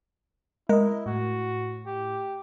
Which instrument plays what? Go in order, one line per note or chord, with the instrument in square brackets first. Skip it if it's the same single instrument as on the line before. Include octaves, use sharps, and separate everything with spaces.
[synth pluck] G#3 [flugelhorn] E4 [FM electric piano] A#4 D#5
[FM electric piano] A2 [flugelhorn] F#4
[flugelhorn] G4